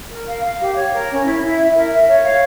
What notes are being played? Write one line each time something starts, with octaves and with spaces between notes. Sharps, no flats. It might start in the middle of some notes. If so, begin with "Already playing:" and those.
A#4
F5
F5
G4
C#5
A#4
C#4
E4
E4
E5
A#4
E5
C#5
F5